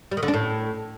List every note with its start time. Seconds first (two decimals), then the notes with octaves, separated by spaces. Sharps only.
0.11 G3
0.17 D#3
0.23 D3
0.28 D4
0.34 A2